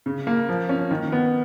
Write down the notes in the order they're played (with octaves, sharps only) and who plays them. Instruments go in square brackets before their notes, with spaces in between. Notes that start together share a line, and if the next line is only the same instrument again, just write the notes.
[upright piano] C#3
A#3
F3
C#4
D#3
B3